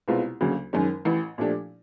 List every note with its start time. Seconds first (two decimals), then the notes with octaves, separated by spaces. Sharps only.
0.08 C2 B2 G#3 C4 F4
0.41 D2 C#3 F#3 A#3
0.73 F#1 F#2 D#3 G#3 C#4
1.05 A1 A2 E3
1.38 A#2 F3 A3 D4 G4